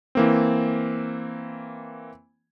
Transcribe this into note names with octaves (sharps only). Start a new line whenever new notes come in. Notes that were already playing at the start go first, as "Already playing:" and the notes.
E3 A#3 C4